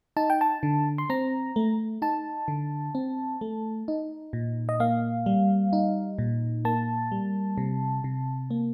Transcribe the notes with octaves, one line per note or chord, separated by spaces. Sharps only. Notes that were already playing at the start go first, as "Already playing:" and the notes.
D#4 A5
G5
A5
D3
C6
C4 A#5
A3
D#4 A5
D3
C4
A3
D#4
A#2
D#5
A#3 F5
G3
D#4
A#2
A#3 A5
G3
C3
C3
A#3